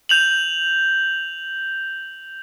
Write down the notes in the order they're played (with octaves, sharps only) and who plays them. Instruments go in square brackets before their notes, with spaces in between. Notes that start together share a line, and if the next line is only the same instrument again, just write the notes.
[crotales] G6 F7 F#7